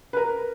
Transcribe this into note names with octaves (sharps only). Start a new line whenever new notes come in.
B4
A#4